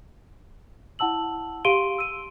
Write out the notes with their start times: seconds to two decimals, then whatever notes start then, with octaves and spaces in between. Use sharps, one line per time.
0.99 E4 F#5 A5 E6 F#7
1.65 G4 F5 C6 D7 D#7 G7
1.98 E6 D#7